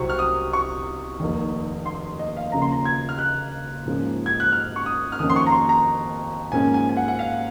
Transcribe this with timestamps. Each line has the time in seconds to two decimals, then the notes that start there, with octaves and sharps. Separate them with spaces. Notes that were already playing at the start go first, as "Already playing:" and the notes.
Already playing: C2 C3 F#3 C4 C#6
0.09 F6
0.19 D#6
0.53 C#6
1.20 F1 D#2 D#3
1.86 C6
2.19 D#5
2.37 F5
2.52 D#2 C#3 F3 A#3 A#5
2.62 C6
2.72 A#5
2.85 G#6
3.09 F6
3.19 F#6
3.86 G#2 F3 A#3 C#4
4.26 G#6
4.40 F#6
4.52 F6
4.76 C#6
4.86 D#6
5.12 F6
5.19 F2 D#3 A#3 C#4 D#6
5.30 C6
5.36 C#6
5.47 A#5
5.52 C6
5.69 A#5
6.52 G#2 F3 A#3 C#4 G#5
6.74 G#5
6.89 G#5
6.97 F#5
7.08 F#5
7.19 F5